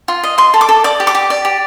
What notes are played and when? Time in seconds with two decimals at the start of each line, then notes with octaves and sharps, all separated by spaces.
0.08 F4
0.24 D#5
0.38 D#5 C6
0.54 A4
0.61 D6
0.69 A4
0.84 D5 D6
1.00 G4
1.07 D6
1.15 G4
1.30 D5
1.45 G4